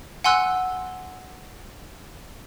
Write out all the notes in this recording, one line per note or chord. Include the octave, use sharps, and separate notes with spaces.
F#5 G#5 C6 E6 F#6